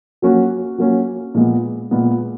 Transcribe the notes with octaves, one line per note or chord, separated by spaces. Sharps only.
F#3 A#3 C#4 F#4
F#3 A#3 C#4 F#4
A#2 G#3 B3
A#2 G#3 B3